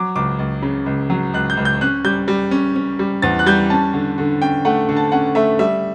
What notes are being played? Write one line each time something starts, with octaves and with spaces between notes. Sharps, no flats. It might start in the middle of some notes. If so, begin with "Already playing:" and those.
Already playing: F#3 D6
C#2 D6
C#2
C#3
C#2
F#3
C#2 F#6
G6
C#2
G6
C#4 F#6
G3 G6
G3
C#4
C#4
G3
E2 A6
F#6
G3 G6
C#4 A5
D3
D3
C#4 G5
A3 F#5
D3
A5
C#4 F#5
A3 E5
G3 E5